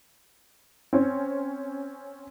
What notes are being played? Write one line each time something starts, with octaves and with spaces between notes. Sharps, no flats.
C4 C#4